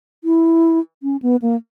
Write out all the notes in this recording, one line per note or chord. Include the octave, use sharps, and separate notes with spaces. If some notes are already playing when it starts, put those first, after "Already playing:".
E4
C#4
B3
A#3